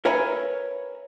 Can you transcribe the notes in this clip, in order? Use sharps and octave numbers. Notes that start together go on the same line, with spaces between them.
A#4 B4 C#5 E5 G#5 A#5